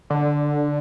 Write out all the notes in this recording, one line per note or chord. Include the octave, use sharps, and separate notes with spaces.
D3